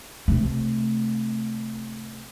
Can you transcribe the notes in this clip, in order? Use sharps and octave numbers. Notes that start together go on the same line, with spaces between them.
C3 A3